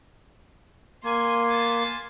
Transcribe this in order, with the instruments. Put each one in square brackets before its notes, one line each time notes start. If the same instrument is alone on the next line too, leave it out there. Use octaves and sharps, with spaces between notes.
[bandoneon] A#3 [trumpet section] G#5 [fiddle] C6
[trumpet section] B3 G#5 A5